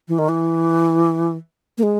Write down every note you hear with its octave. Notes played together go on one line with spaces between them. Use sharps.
E3
D#3
E3
A#3
G#3